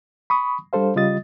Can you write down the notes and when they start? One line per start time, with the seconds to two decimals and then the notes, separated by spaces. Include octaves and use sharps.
0.30 B5 C#6 D#6
0.73 G3 D4 A4 C5 F5
0.96 C#3 G3 F4 D#5 D#6 A6